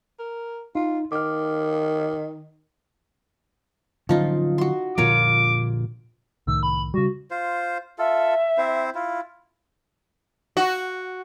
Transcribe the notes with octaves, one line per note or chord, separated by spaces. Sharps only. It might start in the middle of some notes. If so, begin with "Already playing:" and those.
A#4
D#4 F4
D#3 D6 F6
D3 F3 F#3 C#4 D#4 F4
F#4 C6
A#2 D3 F3 F4 A#4 C#5 D6
C2 A2 D#3 E6
B5
C#3 G3 F#4
F4 C5
F4 A4 E5
C4 E4 C5
E4 F4
F#4